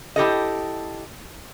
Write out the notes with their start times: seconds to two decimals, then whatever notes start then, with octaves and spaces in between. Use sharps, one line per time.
0.16 E4 G4 A4 D#5